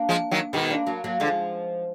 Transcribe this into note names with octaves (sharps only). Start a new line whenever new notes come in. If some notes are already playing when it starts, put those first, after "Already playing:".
Already playing: A#3 D4
F3 G#3
D#3 F#3
B2 D#3 G#3 B3
A#3 D4
F#3 A#3
F#3 A#3
D3 F3 G#3